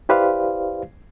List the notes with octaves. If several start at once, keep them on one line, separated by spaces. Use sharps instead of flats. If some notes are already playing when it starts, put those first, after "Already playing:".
E4 G4 B4 C5 D5 F5